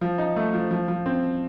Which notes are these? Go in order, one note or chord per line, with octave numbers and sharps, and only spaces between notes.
F3
D#4
A3
F3
F3
F3
C4